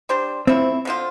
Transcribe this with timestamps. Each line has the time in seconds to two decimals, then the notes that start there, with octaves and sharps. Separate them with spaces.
0.09 G3 D4 G4 C5
0.47 F3 A3 C4 E4
0.85 D3 F3 C4 F4